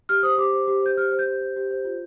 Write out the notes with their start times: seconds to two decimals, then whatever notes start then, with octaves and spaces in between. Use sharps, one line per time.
0.09 G4 F6
0.23 C5 D#6
0.38 G4 D6
0.53 C5
0.67 G4
0.82 C5 G6
0.97 G4 F6
1.12 C5
1.19 G6
1.26 G4
1.41 C5
1.56 G4
1.71 C5
1.85 F4